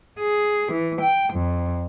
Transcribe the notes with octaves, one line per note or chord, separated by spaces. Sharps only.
G#4
E3
G5
F2